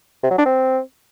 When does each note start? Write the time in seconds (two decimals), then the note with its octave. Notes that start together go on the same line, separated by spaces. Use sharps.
0.23 C3
0.31 F#3
0.38 D4
0.46 C4